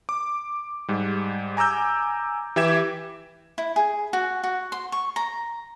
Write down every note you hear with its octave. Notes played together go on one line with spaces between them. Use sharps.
D6
G#2 G3
G#5 A#5 D6 E6 G6
E3 G4 E5 G#6 E7
E4
G#4
F#4
F#4
C6
C#6
A#5